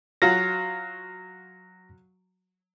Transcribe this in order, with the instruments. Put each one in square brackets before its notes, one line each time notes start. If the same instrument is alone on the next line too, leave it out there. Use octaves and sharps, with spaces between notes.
[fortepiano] F#3 F4 F#4 [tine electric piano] A#6